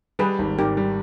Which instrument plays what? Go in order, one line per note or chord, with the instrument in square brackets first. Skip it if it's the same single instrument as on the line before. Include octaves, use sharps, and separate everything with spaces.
[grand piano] G3 [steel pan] G#4 B4
[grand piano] G#1
[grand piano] G#2 [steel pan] G4 A#4
[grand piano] G3